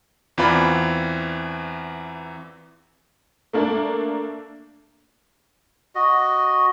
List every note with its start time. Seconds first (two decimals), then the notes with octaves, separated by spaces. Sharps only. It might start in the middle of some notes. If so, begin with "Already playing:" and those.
0.38 E2 E3 C4 F4 D5 B5
3.53 A3 A#3 D4
5.95 F#4 D#5